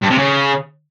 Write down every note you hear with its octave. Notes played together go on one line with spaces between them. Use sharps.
G2
C3
C#3